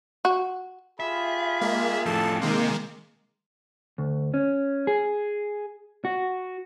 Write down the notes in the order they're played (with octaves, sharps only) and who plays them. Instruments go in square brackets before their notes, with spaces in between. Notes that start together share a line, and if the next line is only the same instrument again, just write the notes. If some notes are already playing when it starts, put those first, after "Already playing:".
[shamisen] F#4
[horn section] F4 G4 G#4 [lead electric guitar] E5 [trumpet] B5
[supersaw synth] G#3 A#3
[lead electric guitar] F2 A2 [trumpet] A4 [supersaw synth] A5
[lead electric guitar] C3 [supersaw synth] D#3 G#3 A#3 [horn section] D#4 C6 [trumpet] A#4
[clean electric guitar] D2
C#4
G#4
F#4